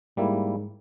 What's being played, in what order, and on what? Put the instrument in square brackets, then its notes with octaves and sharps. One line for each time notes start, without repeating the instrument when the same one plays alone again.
[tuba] G#2 [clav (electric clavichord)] G3 A#3 E4